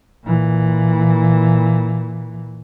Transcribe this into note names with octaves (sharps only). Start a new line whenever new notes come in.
A#2 E3